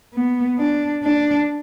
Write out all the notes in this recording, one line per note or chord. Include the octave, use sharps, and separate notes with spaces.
B3
D4
D4